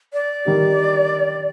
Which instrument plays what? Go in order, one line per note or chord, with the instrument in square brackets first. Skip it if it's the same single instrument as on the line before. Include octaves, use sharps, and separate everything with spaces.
[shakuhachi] D5
[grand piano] D#3 G3 D4 G4